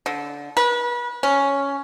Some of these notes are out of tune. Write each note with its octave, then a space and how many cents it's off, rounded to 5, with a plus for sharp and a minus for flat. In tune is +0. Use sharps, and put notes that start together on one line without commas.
D3 -20
B4 -35
C#4 +5